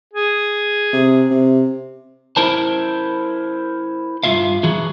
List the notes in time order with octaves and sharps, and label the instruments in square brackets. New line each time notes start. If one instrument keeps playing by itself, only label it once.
[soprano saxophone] G#4
[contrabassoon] C3
C3
[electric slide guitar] E4 A#4 C5 A5
G2 A3 F4 E5 F5
E3 F#4 G#4